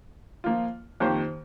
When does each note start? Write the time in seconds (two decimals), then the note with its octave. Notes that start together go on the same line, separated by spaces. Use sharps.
0.44 F3 A#3 F4
1.00 F2 D#3 A#3 G4 C5